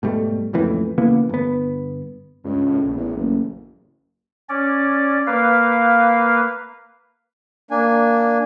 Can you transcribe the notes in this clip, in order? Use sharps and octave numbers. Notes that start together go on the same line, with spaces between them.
G#2 B2 G3 A3
F#1 F2 A2 E3
C#3 E3 A#3 B3
G1 B3
C#2 G2
A2
A#1
A1 E2
F#1
C#4 D5
A#3 B4 F5
A#3 D4 G#5